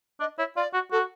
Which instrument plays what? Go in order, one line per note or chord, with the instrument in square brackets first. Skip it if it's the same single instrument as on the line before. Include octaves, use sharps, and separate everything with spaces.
[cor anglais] D4 [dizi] D#5
[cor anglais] E4 [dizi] C#5
[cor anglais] F4 [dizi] D5
[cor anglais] F#4
[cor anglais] F#4 [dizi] A4